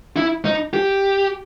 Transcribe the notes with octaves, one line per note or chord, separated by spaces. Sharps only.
E4
D#4
G4